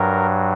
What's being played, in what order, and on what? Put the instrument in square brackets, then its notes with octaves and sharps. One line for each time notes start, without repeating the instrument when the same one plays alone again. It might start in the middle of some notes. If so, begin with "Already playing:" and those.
Already playing: [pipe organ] G2 F#3 A#4